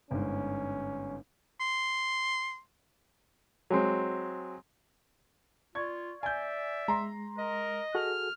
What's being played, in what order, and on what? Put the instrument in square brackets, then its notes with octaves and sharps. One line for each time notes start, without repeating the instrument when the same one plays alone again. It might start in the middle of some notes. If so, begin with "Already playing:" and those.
[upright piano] G1 G#2 [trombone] C#4
[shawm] C6
[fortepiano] F#3 G#3 C4
[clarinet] F4 [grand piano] D5 C#6 G#6
[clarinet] D5 [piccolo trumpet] E5 [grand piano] G#5 G6
[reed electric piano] G#3 [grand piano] A#5 C6
[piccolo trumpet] A#4 [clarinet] D#5
[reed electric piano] F#4 G#4 A4 [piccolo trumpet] F6